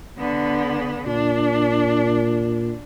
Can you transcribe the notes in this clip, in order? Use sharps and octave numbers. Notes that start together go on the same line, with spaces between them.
D3 B3
A#2 D4